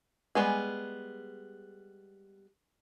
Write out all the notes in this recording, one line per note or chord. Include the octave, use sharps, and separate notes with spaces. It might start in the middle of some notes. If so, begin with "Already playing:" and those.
G3 G#3 B3 G#4